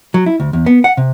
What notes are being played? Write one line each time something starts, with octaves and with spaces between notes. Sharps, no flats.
F#3
E4
D2
E2
B3
F#5
C3